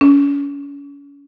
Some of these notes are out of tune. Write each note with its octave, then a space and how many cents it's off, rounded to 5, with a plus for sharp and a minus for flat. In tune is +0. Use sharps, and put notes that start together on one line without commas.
C#4 +35